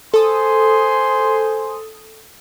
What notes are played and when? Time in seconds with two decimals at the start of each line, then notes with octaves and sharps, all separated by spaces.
0.14 A4 C5 G#5 C6 D#6